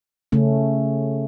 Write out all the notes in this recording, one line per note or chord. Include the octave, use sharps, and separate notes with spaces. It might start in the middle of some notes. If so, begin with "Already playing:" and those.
C#3 A3 C#4